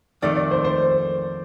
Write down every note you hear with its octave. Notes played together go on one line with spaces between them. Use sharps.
F2 D#3 A3 D5
D5
C5
C5